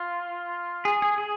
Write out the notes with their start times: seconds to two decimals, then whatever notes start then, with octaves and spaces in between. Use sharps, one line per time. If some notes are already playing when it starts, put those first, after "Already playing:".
Already playing: F4
0.85 G#4
1.02 G#4
1.18 G#4